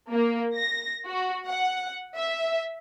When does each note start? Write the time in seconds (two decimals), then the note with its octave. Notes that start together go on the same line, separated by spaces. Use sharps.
0.10 A#3
0.56 A#6
1.07 F#4
1.47 F#5
2.16 E5